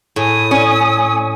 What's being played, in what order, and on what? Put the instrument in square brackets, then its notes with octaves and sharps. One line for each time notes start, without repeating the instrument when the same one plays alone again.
[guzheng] A2 [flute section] G#5 D#6
[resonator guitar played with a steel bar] C#4